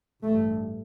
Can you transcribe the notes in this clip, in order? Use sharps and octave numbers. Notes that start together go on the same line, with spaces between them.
A1 G2 A3